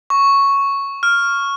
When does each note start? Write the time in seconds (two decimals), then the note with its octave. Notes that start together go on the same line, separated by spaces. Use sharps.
0.10 C#6
1.03 F6